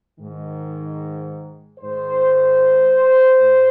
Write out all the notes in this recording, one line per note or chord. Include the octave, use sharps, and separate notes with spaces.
G#2 D#3
G#2 D#3 C5
G#2